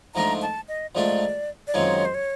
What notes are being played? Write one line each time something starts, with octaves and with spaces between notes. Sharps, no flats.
G#2 F3 A3 D4 F4 A#5
A5
D#5
G#2 F3 A3 D4 F4 D5
D5
F#2 D#3 G#3 C4 F4 C#5
C5
C#5